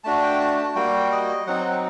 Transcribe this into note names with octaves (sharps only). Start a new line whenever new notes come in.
A3 D4 F#4 A5
G5
A5
A5
G3 A#3 F#4 G5
D#5
F#3 C4 D#4 F#5
F#5